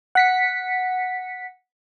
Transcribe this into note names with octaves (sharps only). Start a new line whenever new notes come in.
F#5 B6 C#7